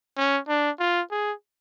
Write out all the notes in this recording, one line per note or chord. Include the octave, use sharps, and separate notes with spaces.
C#4
D4
F4
G#4